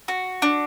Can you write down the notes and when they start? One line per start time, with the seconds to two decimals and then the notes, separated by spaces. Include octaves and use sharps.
0.08 F#4
0.42 D4